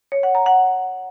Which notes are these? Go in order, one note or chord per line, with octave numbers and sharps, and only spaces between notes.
C#5
F#5
A#5
F#5